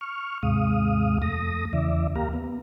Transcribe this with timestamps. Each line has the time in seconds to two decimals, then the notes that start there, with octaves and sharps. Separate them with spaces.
0.01 C#6 F6
0.43 D#2 G#2 C3 G#3 F5 D#6
1.22 F2 A3 D#6 A#6
1.73 E2 C#3 E3 D5 E5
2.16 D#2 A#3 G4 F5 A#5
2.33 B3